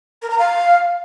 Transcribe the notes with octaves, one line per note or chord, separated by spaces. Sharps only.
A#4
A#5
F5